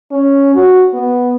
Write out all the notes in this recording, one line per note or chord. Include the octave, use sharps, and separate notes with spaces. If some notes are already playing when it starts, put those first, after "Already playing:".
C#4
F#4
B3